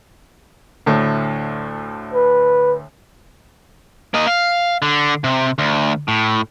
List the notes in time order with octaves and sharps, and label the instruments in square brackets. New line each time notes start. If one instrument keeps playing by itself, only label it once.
[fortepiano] D2 A2
[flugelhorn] B4
[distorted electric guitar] A#3 D#5
F5
D3
C3
D2
A2